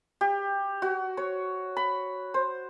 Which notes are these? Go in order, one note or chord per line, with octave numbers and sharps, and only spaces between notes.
G4
F#4
C#5
B5
C5